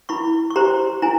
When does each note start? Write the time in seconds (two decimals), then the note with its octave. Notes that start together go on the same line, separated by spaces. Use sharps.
0.09 E4 B5 C#6
0.51 C#6
0.56 G4 C5 A#5 C6
1.02 E4 G#5 A#5